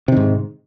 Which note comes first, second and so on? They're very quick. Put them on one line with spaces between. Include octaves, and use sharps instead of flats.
C3 D#3 G#2